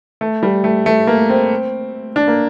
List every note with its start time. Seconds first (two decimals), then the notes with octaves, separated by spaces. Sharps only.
0.21 A3
0.43 G3
0.64 A3
0.86 A3
1.07 A#3
1.29 C4
2.16 D4
2.28 A#3